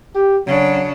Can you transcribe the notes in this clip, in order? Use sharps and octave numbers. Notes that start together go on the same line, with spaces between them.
G4
C#3 F#3 D4